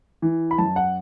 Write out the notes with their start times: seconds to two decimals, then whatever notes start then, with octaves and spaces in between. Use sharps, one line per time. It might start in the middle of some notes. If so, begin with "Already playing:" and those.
0.22 E3
0.51 B5
0.58 F#2 A5
0.76 F#5